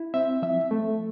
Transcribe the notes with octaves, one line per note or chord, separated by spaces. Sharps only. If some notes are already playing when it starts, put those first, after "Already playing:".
Already playing: E4
C4 E5
F3 E5
A3